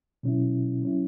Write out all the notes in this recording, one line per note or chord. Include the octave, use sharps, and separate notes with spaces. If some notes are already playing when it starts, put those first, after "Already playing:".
B2 F#3 C#4 E4
F#3 C#4 E4